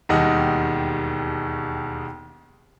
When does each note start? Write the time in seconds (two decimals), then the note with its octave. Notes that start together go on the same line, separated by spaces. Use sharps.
0.09 E1 D#2 D#3 G3 D#5 F#5